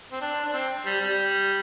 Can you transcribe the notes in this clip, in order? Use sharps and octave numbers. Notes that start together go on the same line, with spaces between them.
C4
D4
D4
C4
G3
G3